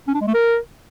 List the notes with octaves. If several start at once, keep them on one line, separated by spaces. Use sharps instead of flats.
C#4
D4
G#3
A3
A#4